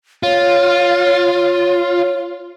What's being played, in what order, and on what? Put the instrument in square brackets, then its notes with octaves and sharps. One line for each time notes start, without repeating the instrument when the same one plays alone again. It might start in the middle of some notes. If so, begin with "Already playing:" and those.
[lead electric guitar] F4 [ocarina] C#5